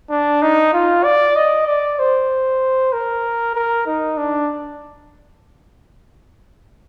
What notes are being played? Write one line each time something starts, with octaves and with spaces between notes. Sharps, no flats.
D4
D#4
F4
D5
D#5
D5
C5
A#4
A#4
D#4
D4